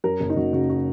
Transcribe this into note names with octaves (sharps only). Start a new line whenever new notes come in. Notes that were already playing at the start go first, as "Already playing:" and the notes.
F#2 A#4
F#1
D#4
F#1 F#4
C#3 F#4
F#4